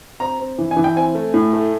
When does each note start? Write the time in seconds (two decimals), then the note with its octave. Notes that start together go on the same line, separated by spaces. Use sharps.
0.20 C4 A#5
0.40 C4
0.58 E3
0.71 G#5
0.77 E3
0.84 G5
0.96 C4 G#5
1.15 A3
1.34 A2
1.53 A3